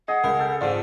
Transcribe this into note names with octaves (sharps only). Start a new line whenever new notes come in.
G#4 D#5 F#5
C#2 A#4
A4 G5
F2 G#2 D3 F4 D5